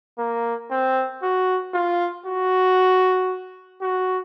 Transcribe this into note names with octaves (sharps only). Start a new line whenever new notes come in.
A#3
C4
F#4
F4
F#4
F#4